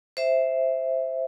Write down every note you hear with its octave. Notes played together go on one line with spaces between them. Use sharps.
C5 E5